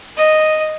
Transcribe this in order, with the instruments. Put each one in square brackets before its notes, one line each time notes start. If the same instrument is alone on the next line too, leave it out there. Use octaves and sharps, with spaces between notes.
[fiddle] D#5